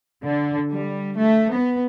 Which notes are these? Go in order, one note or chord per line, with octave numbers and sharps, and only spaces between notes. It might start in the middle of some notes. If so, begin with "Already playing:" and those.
D3
G3
A3
B3